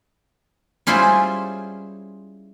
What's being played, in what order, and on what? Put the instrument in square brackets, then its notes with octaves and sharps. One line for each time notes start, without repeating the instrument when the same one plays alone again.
[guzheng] G3 C#4 E4 F4 G#4 C5